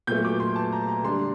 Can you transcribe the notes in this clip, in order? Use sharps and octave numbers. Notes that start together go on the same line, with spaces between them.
A#2 F#3 A3 G6
D6
C6
A5
A#5
A#5
D3 G3 D4 C6